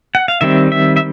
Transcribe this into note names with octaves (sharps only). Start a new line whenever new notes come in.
F#5
F5
D#3 G3 C4 E5
E5
E5